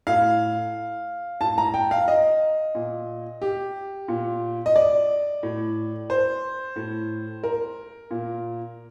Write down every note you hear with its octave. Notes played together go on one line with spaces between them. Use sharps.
A2 F5
A2 A5
A#5
G5
F5
D#5
A#2
G4
A#2
D#5
D5
A2
C5
A2
A#4
A#2